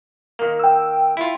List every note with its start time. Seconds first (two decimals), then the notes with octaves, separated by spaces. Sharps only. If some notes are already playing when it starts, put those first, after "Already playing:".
0.39 D#3 A#3
0.59 G5 E6
1.17 E4 F4